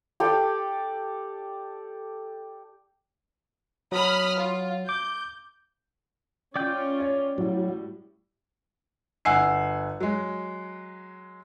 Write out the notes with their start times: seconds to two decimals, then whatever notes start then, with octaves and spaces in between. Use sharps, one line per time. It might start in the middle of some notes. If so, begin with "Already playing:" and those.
0.20 G4 A4 D5
3.92 F#3 B5 D#6 F6
4.36 F4
4.89 D6 G6
6.56 C#4 F4 D5 G5 G6
7.00 C#5
7.38 A2 F#3 G3
9.25 G1 F#5 G#5 E6 C7
10.00 F#3 G#3